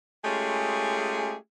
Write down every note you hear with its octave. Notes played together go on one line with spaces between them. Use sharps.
G#3 A3 C#4 F4 G4 G#4